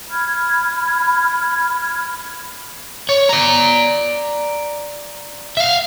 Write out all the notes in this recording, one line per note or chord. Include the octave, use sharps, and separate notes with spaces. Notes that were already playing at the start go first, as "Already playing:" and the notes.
B5 F6 G#6
C#5
D5 A#5
E5 F5